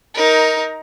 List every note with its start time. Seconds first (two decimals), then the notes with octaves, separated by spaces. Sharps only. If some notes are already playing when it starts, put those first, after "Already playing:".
0.14 D#4 A#4